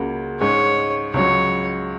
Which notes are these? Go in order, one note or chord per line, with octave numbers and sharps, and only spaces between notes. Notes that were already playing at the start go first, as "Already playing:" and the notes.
Already playing: C#2 C#3 A#3 F#4
G#2 G#3 C#4 C#5
C#2 C#3 F#3 C#5